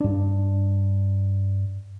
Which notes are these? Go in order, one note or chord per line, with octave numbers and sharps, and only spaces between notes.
G2 D4